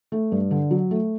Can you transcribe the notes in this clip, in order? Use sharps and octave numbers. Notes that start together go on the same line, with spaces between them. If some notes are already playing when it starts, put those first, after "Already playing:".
A3
G2
D3
F#3
A3